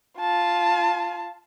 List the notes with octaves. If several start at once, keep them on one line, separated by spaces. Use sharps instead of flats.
F4 A5